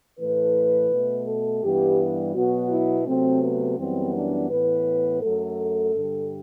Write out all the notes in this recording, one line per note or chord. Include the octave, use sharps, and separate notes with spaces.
A2 E3 A3 B4
B2 A3
A4
G2 E3 G3 B3 G4
B2 F#3 B3 F#4
E4
C3 F#3 A3 C4
B3
F#2 E3 G3 B3 C4
D4
A2 E3 B3 B4
F#2 F#3 A3 A4
G2 D3 G3